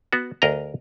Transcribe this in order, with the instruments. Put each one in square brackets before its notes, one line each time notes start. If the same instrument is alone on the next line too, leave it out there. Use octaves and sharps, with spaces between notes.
[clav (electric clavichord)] B3 F#4
D2 A#4 D#5 A#5